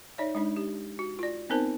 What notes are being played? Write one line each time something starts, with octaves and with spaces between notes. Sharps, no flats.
D#4 C#5 D5 E5
G#3 D4 D#4
G4
F#4
F4 D5
B3 C4 D#4 A#4 C5 A5